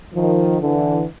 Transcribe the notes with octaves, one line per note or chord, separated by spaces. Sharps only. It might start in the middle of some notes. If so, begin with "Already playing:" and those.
D#3 F3
D3 E3